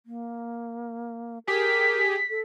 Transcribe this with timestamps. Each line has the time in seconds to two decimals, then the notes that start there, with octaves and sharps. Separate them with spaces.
0.06 A#3
1.48 G4 G#4 A#4 B6
2.30 A4